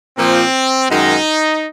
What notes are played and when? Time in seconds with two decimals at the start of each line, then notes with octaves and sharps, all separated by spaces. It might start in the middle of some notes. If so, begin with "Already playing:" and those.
0.17 A#2 F3 A#3 C4
0.89 F#2 D#3 G#3 D#4